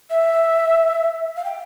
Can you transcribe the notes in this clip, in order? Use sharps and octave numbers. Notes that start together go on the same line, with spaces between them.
E5
F5
G5